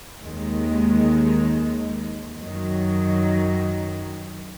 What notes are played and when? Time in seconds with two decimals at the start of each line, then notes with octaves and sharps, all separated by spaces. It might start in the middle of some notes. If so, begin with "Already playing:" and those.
0.21 D#2 D#3 G#3
2.36 F#2 D#3 F#3